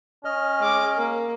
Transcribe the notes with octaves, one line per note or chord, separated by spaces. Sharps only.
C#4 D#5 F6
G#3 D6
A#3